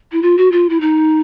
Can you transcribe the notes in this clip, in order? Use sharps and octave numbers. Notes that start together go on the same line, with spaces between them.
E4
F4
F#4
F4
E4
D#4